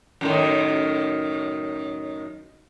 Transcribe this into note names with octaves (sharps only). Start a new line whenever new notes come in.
F#2 A2 D#3